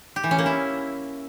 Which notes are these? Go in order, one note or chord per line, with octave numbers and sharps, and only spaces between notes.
G4
E3
C#4
A#3
E4